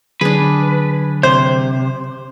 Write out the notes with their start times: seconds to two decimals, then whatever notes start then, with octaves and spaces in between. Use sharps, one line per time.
0.21 D3 F#3 D4 G#4 B4
1.23 C3 C5